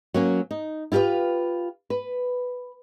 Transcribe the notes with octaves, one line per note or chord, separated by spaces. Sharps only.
F#3 A#3 C#4
D#4
E4 F4 G4 B4 F5
B4